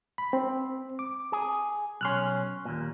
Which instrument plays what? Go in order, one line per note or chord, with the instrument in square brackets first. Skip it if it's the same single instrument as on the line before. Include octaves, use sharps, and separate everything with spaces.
[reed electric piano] B5
C4
D6
[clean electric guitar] G#4
[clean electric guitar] B1 C#4 [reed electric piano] C6 F6 F#6
[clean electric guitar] D#2 A#2